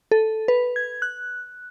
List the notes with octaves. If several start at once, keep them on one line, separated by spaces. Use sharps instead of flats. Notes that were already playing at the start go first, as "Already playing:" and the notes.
A4
B4
G#6
F#6